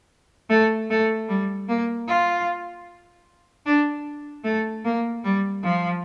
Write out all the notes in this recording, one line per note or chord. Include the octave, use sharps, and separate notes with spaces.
A3
A3
G3
A#3
F4
D4
A3
A#3
G3
F3